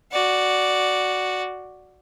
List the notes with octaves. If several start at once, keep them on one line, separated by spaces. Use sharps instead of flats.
F#4 D5